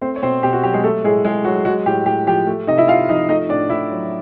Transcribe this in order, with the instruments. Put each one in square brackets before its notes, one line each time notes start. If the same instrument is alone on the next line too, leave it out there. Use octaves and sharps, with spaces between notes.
[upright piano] A3 C4 C5
C#5
B2 C4 C5
B2 G4
F#4
F#3 G4
G#3 G#4
A3 A4
A2 G#3 G#4
A2 G#3 G#4
F#3 F#4
G#3 F#4
A2 G4
A2 G4
F3 G4
A3
C3 D#4 D#5
E4 E5
C3 F4 F5
F3 D#4 D#5
A3 D#4 D#5
A2 D4 D5
A2 E4 E5
F#3